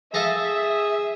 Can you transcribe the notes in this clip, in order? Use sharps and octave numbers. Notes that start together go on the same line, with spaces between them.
G#4 A4 E5 F5 A#5